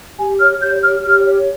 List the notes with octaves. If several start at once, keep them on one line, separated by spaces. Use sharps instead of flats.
G4 G#5
C#5 F6
G4 G6
C#5 F6
G4 F6
C#5